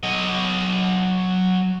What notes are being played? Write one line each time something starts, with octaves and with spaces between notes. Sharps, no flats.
F#3 D#5